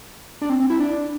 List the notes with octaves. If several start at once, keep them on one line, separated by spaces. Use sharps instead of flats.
D4
C4
C4
E4
D4